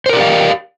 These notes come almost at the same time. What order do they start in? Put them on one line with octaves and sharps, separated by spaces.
C5 A#4 D5 G4 F5